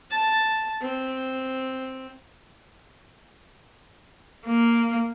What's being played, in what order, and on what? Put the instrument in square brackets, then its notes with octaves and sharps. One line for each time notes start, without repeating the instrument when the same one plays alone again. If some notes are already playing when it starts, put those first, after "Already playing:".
[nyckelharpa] A5
C4
[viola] A#3